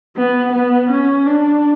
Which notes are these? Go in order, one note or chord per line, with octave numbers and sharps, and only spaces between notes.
B3
B3
C#4
D4